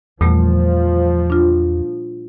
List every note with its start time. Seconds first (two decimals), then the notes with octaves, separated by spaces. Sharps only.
0.21 E2 A#2 F3 G3 A3
1.30 D4 F4